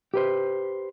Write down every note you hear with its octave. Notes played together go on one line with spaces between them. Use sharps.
G4 B4 C5